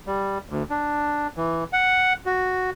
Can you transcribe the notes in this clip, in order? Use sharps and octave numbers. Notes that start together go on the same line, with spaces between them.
G3
D2
D4
E3
F#5
F#4